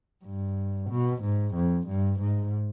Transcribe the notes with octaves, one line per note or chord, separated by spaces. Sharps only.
G2
B2
G#2
F2
G2
G#2